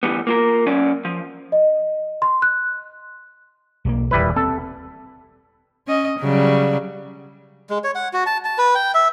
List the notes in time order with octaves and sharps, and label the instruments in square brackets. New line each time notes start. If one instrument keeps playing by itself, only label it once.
[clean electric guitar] D2 E3 G3 B3
A#3 F4 A#4
F#3 C#4 C#5 D5
F3
[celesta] D#5
C6
F#6
[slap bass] B1 E3 A#3
[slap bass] D#1 B1 [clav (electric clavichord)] G3 E4 B4
[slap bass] C4 [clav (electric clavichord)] A4
[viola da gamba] C#4 D#5
C#3 F#3 G3
[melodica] G#3
C#5
F#5
F#4
A5
A5
B4
G5
E5